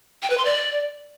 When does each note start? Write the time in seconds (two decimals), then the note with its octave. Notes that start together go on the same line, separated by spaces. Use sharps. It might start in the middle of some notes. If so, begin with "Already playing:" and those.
0.22 G5
0.30 B4
0.38 C6
0.45 D5